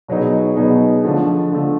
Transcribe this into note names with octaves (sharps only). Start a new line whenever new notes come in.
B2 F#3 B3 D#4 G#4
B2 F#3 B3 D#4 G#4
D3 F3 A3
D3 F3 A3